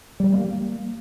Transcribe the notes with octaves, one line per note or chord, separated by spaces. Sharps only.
G3
A#3